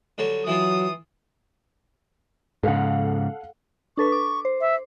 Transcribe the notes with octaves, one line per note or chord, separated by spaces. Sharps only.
D3 F#3 G3
E3 F#3 E4 F4 D#6
G#2 C#3 A4 F5 F#5
D4 A4 B4 C#6
D6
C5
E5